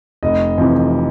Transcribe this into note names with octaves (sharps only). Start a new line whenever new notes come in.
F1 D#5
F2 C3 E3